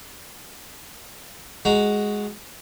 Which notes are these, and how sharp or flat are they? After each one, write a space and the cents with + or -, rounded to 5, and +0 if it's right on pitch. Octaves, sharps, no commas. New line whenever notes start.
G#3 +0 F#4 +0 A#5 +0